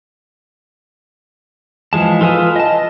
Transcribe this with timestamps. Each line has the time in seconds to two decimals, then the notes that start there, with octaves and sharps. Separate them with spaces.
1.93 E3 F3 G#3 A5
2.21 F4 A4 B4 G#5 D#6
2.56 D#5 A5